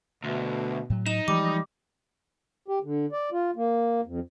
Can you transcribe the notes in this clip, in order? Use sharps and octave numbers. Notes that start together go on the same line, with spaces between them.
D2 B2
A2 F#3
D#4 E7
E3 F3 G3 G#3 D6
G4
D3
D5
F4
A#3
F2